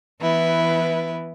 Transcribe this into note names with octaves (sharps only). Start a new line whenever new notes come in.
E3 B3 E4 B4